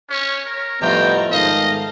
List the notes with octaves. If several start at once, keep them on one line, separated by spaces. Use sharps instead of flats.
C#4 C#5
A#4
F2 A2 G3 A3 B3 F4 G5 A#5
G#2 D#3 A4 D#5 F5